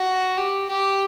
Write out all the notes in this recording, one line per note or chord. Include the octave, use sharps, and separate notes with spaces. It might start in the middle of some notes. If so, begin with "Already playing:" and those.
Already playing: F#4
G4
G4